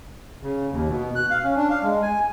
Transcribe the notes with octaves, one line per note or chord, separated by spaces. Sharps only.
C#3
D#2
B2
F#6
F5
C#4
D4
F5
G#3
G#5